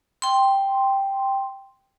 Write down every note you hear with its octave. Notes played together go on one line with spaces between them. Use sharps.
G5 C6